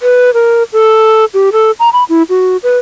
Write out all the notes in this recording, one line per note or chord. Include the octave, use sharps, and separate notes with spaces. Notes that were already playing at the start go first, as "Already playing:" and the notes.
B4
A#4
A4
G4
A4
A#5
B5
E4
F#4
B4